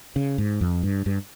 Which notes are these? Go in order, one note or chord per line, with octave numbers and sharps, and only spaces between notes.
C#3
G#2
F2
G2
G2